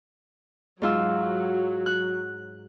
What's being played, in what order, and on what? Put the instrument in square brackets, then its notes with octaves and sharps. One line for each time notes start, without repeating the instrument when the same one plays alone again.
[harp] G#2 F4 E6 [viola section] F#3
[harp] F#6